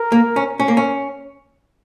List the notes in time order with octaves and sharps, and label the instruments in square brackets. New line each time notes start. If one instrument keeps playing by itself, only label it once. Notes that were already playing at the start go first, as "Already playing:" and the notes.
Already playing: [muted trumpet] A#4
[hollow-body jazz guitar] A#3
C#4
C#4
A#3
C#4